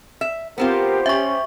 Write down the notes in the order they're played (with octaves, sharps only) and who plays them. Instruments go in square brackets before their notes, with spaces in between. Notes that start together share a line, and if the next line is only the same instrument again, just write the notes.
[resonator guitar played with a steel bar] E5
[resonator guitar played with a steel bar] B3 C4 F4 [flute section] G4 C5 [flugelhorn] A#4
[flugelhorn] C#4 [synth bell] E5 C#6